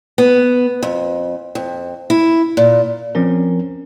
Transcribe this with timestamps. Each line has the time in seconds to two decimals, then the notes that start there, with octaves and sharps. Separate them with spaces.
0.18 B3
0.83 F2
1.55 F2
2.10 E4
2.57 A#2
3.15 F3 C4 C#4 A#4